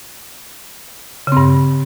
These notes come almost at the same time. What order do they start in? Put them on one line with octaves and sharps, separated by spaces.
C#3 C4 G2